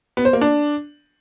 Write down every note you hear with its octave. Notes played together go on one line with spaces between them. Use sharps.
B3
C5
A#3
D4